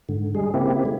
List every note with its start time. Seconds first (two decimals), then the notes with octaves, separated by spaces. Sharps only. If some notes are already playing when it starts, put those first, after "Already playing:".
0.09 G#2 D3
0.35 G3 G#3 G#4
0.54 C#3 A#3 C4 E4 G4
0.85 G#3 A3 E4